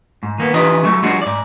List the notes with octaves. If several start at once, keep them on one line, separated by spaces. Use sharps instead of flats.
G#2
D#3 A#3 B3
E3 F3 D4 G4 B4 D#5
F#3 A3
F3 G3 G#3 D4 F#4
G#2 D5